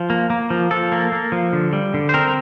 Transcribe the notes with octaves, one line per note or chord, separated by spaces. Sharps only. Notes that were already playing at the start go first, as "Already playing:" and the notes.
Already playing: F3
A#3
A#3
F3
F3 A4
A#3
A#3
F3
D3
G3
D3
C5
C4 A#4